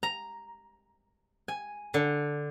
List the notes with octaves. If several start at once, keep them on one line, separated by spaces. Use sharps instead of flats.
A#5
G#5
D3